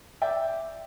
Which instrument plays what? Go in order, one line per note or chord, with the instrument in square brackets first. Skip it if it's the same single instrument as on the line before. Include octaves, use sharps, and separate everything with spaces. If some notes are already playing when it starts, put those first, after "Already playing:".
[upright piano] D5 E5 G5